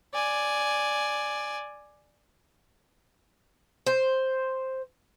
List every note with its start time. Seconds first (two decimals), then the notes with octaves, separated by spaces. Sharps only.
0.13 D5 G#5
3.87 C5